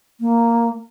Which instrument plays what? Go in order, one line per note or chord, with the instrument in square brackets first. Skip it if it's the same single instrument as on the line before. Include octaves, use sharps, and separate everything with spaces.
[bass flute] A#3